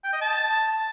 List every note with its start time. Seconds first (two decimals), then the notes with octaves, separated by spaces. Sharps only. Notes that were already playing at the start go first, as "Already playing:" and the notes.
0.04 G5
0.13 D#5
0.21 A5